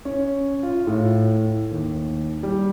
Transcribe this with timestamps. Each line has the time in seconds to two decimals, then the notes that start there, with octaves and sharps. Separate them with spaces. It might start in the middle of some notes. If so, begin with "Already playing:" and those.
0.05 C#4
0.63 F4
0.87 A2
1.71 D#2
2.43 G3